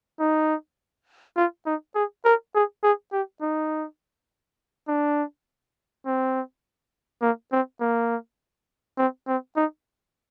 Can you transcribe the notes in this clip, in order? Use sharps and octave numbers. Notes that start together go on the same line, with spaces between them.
D#4
F4
D#4
G#4
A#4
G#4
G#4
G4
D#4
D4
C4
A#3
C4
A#3
C4
C4
D#4